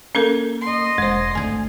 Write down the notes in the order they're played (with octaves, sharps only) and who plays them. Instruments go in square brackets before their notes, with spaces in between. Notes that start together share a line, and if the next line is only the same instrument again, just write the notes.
[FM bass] A#3 [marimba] C#4 A4 A#4
[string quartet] D#5 C6
[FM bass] E1 [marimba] G#3 C5
[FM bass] G#1 [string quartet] D2 [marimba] G#5 G#6